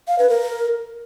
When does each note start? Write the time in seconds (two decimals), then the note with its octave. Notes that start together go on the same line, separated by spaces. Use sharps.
0.08 F5
0.19 B4
0.29 A#4